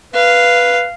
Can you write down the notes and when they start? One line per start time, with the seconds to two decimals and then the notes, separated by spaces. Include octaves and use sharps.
0.14 B4 F5